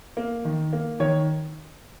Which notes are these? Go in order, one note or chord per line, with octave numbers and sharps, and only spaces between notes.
A#3
D#3
A#3
D#3 C#5